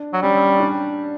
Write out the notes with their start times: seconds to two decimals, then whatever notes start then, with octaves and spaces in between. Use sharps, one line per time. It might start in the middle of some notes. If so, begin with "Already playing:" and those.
Already playing: D4
0.13 F#3
0.22 G3 C#4
0.60 D4